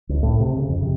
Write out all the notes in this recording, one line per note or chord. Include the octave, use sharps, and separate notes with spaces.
C#2
A2
C3
C#3
F2
C3